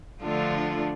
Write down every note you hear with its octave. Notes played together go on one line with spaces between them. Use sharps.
D3 F3 A3 D4 F4